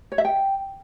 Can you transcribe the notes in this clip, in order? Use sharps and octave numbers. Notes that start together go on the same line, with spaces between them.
C#5
E5
G5